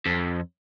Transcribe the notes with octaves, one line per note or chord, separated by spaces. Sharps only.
F2